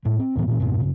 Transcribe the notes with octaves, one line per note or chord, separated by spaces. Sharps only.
A2 G#3
C4
D2 A2 E3 B3
A#2 E3 C#4
F2 G#2 B2
F#1 C#3